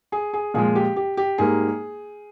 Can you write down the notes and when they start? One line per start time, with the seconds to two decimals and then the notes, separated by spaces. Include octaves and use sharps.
0.12 G#4
0.33 G#4
0.54 A#2 F3 G#3 G#4
0.75 G4
0.96 G4
1.17 G4
1.38 G#2 G3 A#3 G#4